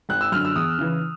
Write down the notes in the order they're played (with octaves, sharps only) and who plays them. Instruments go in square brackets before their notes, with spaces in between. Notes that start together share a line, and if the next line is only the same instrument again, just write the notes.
[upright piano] G#1 F#6
E6
F#2 D3 F6
E6
E2 D#6
C#3 E3